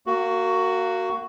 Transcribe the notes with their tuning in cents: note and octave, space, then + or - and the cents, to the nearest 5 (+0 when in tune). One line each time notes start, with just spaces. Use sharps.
A#3 -20 F#4 +10